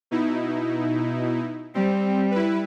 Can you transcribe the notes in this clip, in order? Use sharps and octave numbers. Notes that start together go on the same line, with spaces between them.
B2 D#4 E4
G3 C4
E4 B4